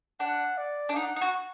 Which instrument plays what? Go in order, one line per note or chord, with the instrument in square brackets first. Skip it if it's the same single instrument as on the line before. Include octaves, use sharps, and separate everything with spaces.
[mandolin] D4 [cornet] F#5
[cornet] D5
[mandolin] D4
[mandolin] D#4 [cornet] F#5
[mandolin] D#4
F#4